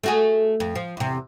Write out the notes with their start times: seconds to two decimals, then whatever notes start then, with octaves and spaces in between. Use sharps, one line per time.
0.04 A3 F#4 G#4
0.60 F2
0.75 F3
0.97 E2 C3